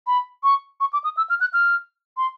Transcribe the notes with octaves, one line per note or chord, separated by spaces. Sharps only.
B5
C#6
C#6
D6
D#6
E6
F6
F#6
F6
C6